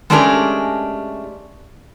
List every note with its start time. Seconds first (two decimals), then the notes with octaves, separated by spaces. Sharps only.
0.10 G#3 A3 C#4 D4 G4 A#4